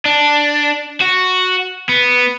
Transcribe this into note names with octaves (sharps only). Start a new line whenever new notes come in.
D4
F#4
B3